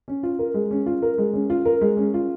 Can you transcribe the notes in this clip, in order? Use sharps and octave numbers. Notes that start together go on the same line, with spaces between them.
C#4
F4
A#4
G#3
C#4
F4
A#4
G#3
C#4
F4
A#4
G#3
C#4
F4